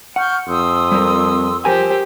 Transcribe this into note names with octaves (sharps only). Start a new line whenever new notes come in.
F#5 C#6 F6 G6
F2 C6 D#6 E6
G3 C4 A#4
F3 G4 A#4 C5 G#5